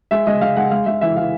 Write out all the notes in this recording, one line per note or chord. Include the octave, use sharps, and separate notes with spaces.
G#3 E5
G#3 D#5
G#3 F5
G#3 F#5
G#3 F5
G#3 E5
E3 E5
E3 F5